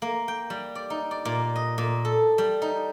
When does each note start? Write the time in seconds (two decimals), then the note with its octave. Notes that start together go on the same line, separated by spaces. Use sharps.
0.02 A#3
0.28 G5
0.50 G3
0.75 D5
0.90 D#4
1.11 D5
1.25 A#2
1.56 D#5
1.78 A#2
2.05 A4
2.38 G3
2.62 D#4